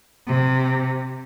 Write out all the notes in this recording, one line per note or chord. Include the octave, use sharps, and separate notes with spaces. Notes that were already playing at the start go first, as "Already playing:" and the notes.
C3